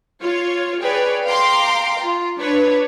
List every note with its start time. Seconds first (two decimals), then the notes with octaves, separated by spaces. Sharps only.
0.22 F4 C#5
0.80 G#4 B4 C#5 D5 G5
1.27 F5 G5 A#5 C6 D6
2.01 F4
2.40 D4 B4 C#5